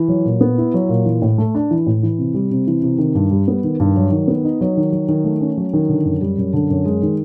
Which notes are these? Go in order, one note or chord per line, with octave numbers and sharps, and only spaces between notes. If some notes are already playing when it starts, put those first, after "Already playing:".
Already playing: E3
F#3
A#2
B3
E4
F#3
A#2
E3
A2
A3
D4
E3
A2
E3
C3
G3
C3
E3
C3
D#3
G2
G3
B3
D#3
G2
F#3
D#3
B3
D#4
F#3
D#3
F#3
D#3
A3
C#4
F#3
D#3
D3
F#2
G3
F#2
D3
F#2
G#3
D#3